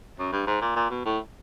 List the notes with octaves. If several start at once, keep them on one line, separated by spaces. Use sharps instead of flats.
F#2
G2
G#2
A#2
A#2
B2
A2